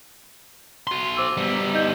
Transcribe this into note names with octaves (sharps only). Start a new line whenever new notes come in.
F#4 C6
C5 D6 E6
G3 B3
D#4 D#5 G6